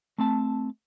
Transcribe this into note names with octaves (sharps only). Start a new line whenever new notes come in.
A3 C4 A5